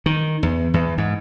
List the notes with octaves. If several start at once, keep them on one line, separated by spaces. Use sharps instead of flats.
D#3
E2
E2
G#2